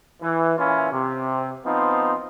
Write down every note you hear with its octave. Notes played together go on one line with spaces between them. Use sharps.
E3
A#2 E3 C#4 E4 F4
C3
F3 B3 C4 D#4